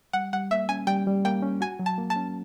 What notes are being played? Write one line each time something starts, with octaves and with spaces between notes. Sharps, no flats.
G3 F#5
G3 F#5
A#3 E5
C#4 G#5
G3 G5
G3
A#3 G5
C#4
F#4 G#5
F#3
A5
A#3
A5
C#4